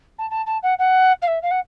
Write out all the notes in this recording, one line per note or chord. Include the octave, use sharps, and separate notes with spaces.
A5
A5
A5
F#5
F#5
F5
E5
F5
F#5